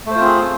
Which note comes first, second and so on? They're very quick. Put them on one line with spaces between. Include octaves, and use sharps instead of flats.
A3 C5 F4 C4 G#4